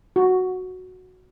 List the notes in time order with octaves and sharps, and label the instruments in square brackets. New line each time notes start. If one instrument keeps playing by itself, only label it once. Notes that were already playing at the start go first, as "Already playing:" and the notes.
[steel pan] F#4